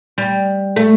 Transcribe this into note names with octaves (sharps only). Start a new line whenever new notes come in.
G3
A3